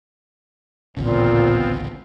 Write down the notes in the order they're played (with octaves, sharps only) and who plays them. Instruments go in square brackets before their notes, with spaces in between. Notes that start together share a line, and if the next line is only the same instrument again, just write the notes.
[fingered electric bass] A1 D2 C#3 [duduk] A#2 [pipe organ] B3 C4 F4